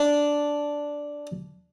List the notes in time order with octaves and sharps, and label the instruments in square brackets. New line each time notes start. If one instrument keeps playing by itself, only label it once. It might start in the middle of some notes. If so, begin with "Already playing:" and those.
Already playing: [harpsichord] D4